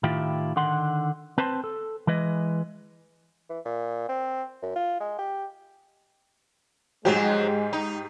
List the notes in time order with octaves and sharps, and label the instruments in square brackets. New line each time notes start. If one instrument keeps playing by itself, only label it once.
[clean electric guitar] A2 D#3 E4 F4 G4
D3 D#3 F#5 C6
C4 B4 C5 A5 C6
A4
E3 G#3 B4 D#5
[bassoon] E3
A#2
C4
F#2
F4
G#3
G4
[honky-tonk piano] G#2 G4 [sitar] F3 F#3 [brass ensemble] G#3
[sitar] D#4